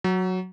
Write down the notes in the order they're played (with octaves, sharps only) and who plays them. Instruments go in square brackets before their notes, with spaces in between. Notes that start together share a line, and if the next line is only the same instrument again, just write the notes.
[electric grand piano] F#3